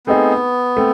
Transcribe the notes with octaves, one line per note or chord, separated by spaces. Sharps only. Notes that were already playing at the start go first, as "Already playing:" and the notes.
A3 B3 C4 D#4 G#4
A3 C4